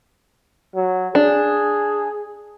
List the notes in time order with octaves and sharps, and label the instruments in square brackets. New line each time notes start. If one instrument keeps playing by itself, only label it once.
[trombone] F#3
[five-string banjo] D4 [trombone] G#4